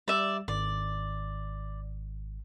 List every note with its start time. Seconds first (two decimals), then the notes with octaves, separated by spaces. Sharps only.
0.08 G3 D5 E5
0.48 G#1 D5